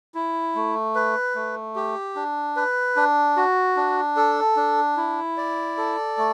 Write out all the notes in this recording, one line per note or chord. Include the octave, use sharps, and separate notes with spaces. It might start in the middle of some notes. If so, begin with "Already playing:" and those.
E4
A3
B4
A3
G4
D4
B4
D4
F#4
D4
A4
D4
E4
D5
A4
A3